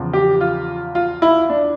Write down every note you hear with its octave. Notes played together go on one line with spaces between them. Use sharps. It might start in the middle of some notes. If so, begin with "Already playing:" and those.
Already playing: E2 C#3 F3
G4
F4
F4
E4
D4